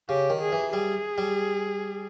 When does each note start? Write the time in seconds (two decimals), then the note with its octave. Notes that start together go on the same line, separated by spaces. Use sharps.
0.09 C#3 G4
0.30 D#3
0.41 G#4
0.52 E3
0.73 G3 G#4
1.18 G3